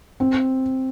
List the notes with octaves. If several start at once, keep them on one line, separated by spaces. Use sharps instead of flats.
C4